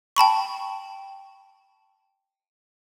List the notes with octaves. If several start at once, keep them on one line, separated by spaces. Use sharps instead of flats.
G5 A5 B5 C#6